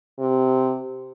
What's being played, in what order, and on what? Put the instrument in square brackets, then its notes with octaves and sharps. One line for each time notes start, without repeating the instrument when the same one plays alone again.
[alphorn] C3